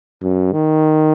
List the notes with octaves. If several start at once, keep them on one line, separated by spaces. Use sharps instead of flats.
F#2
D#3